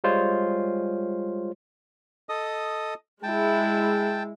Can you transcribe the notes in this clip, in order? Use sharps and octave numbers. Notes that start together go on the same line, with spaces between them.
G3 G#3 F4 C5 C#5
A4 D#5 D#6
G#3 E4 G5 A5